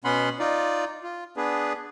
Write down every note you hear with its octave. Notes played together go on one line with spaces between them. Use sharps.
B2 B3 C#4 F#5 B5 C6
D#4 F4 D5
F4
B3 D4 G#4 B4